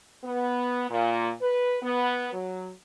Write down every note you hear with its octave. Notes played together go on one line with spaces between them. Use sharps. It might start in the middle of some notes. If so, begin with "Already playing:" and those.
B3
A#2
B4
B3
F#3